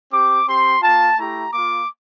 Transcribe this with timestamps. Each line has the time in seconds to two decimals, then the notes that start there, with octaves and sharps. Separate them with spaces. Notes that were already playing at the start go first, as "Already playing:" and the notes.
0.12 C4 G4 D6
0.47 C4 G4 C6
0.82 A#3 F4 A5
1.17 A3 E4 G4 A#5
1.52 A#3 F4 D6